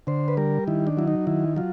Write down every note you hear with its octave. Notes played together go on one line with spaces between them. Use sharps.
D3 C5
B4
G3 A#4
D#3 E4
D4
F#3 E4
D#4
D#3 E4
F#3 F4